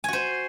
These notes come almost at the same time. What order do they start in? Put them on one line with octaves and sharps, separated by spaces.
G#5 F#4 C5